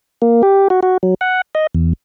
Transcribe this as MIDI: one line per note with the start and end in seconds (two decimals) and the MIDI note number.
0.22 0.42 58
0.43 0.68 67
0.70 0.80 66
0.83 0.97 66
1.03 1.14 54
1.21 1.41 78
1.55 1.67 75
1.75 1.93 40